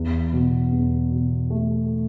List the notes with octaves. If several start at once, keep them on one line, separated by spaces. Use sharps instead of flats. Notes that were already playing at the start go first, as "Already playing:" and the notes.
Already playing: E2
B2
E2
B2
A3